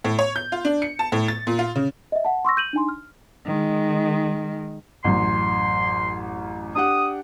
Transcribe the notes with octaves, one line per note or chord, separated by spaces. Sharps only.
A2
C#5
G6
F4
D4
C#7
A5
A2
A6
A#2
F4
C#3
D#5 E5
F#5 A5
C6 C#6 E6 A#6
G6 D#7 F#7
D4 D#4 G#5 C6
F6
D#3 G#3
A1 F#2 C6
D4 G4 F#5 D#6